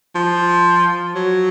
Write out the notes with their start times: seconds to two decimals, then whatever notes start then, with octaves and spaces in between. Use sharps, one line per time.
0.15 F3
1.15 F#3